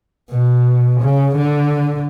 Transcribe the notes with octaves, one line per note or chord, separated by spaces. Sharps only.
B2
C#3
D3